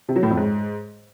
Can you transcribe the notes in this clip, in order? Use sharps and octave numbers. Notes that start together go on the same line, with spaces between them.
C3
F#3
A2
F2
G#2